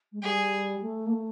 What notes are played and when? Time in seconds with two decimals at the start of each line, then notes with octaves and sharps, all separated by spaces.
0.12 G#3
0.22 G3 G#4
0.82 A3
1.06 A#3
1.12 A3